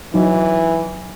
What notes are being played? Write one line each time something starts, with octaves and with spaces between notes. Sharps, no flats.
E3 F#3 D#4